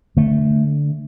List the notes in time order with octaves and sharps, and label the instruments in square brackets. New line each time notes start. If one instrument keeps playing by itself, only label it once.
[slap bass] D3 A3